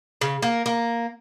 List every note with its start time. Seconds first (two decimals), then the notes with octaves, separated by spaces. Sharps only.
0.21 C#3
0.42 A#3
0.66 A#3